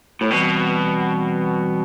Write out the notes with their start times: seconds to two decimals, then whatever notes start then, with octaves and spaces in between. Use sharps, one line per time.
0.21 A2
0.30 B2 E3 G3 C4